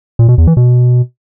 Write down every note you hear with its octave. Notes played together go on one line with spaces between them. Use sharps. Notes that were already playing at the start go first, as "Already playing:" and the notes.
A#2
B2
E2
E3
B2